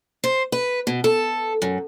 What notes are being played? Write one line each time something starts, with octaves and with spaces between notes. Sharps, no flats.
C5
B4
B2
A4
F#2